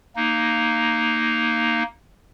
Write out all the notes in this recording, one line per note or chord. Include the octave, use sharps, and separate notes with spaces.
A#3 D#4